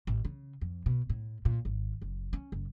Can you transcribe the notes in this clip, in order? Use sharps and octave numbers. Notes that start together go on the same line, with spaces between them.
A1
C#3
F2
B2
A2
A#2
G#1
F#1
C#4
F#1